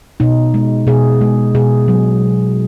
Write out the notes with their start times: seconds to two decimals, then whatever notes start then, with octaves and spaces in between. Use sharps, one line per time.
0.20 B2 D#4
0.54 G#3
0.87 B2 G#4
1.21 G#3
1.55 B2 G#4
1.88 F#3